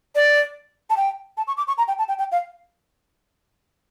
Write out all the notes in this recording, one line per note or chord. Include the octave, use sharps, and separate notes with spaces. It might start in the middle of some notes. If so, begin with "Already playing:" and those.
D5
A5
G5
A5
C#6
D6
C#6
A#5
G5
A5
G5
G5
F5